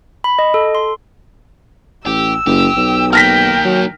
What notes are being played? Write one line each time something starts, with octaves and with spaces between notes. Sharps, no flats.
B5
D#5
A4
C6
A1 G4 E6
F#1 G4
B1
D#3 A#3 G5 F6 A#6 B6
F#3